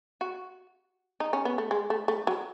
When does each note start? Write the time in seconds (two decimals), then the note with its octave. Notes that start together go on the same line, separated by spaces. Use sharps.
0.21 F#4
1.20 D#4
1.33 C#4
1.45 B3
1.58 A3
1.71 G#3
1.90 A3
2.08 A3
2.27 F#3